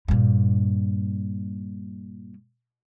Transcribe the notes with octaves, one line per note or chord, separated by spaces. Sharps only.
G2 A#2